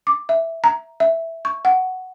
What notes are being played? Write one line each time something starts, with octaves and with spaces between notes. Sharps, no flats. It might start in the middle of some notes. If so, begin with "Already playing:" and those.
D6
E5
A#5
E5
C#6
F#5